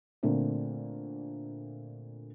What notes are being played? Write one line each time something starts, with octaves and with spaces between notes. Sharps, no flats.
A#2 D3 A3 A#3 C4